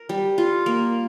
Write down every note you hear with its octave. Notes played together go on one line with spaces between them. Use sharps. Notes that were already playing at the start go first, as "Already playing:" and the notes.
Already playing: A#4
G3
F4
A#3